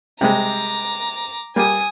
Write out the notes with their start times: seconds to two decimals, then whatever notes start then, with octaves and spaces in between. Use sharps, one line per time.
0.21 C3 G3 G#3 A#5 D6
1.56 G3 A#3 G#5 D#6